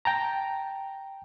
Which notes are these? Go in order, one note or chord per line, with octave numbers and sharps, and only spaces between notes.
G5 A5 A#5